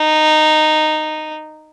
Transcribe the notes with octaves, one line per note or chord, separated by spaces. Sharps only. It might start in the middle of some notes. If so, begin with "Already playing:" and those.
Already playing: D#4